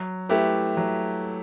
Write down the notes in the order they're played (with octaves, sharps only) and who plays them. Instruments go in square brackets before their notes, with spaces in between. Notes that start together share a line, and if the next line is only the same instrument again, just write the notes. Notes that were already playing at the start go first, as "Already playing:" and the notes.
Already playing: [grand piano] F#3
A3 E4 G4 B4
F#3